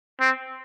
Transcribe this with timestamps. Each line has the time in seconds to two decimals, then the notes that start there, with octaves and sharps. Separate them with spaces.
0.21 C4